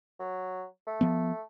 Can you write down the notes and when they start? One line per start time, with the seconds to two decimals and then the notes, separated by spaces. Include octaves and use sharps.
0.19 F#3
0.87 A3
1.01 F3 B3